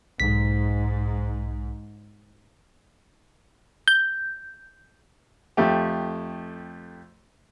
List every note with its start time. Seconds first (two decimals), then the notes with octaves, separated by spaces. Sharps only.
0.20 B1 G#2 B6
3.88 G6
5.57 F2 A3 G4